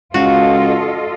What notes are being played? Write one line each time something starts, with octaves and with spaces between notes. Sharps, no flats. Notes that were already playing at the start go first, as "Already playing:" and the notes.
C#2 F4 F#4 A4 D#5 F5